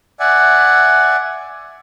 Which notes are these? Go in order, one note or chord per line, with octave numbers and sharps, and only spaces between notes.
D5 E5 F#5 G#5